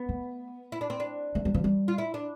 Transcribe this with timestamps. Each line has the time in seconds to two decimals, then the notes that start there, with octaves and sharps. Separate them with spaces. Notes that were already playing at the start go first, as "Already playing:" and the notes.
Already playing: B3
0.09 A3
0.72 E4
0.81 D4
0.90 C4
1.00 D4
1.35 A3
1.45 G3
1.54 F3
1.64 G3
1.88 F4
1.98 E4
2.14 D4